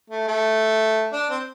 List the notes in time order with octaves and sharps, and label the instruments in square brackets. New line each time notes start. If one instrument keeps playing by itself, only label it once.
[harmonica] A3
A3
D4
C4